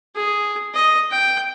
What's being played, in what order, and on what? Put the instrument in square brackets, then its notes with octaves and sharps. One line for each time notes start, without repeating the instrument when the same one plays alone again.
[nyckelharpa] G#4
D#5
G5